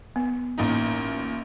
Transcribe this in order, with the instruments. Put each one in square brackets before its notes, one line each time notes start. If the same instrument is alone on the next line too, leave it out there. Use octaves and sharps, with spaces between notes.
[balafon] B3
[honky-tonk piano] A1 A#2 D#4